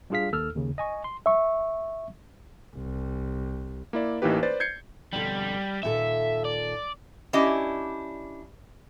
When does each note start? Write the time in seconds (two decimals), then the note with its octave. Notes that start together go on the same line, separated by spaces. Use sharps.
0.10 G3 D4 F4 G#4 F5 B6
0.32 D#2 A4 E6 F6
0.55 D#2 C#3
0.78 D#5 G#5 C#6
1.04 C6
1.26 E5 C#6
2.76 C2
3.93 A#3 E4 D5
4.22 A1 E3 A#3 D#4 G4 B4
4.43 B4 C5 D5 A6
4.60 G6 G#6 C7 C#7
5.13 F2 B2 D3 G3
5.83 D#2 A#2 A4 E5
6.45 D5
7.33 C#4 D4 E4 G4 D#5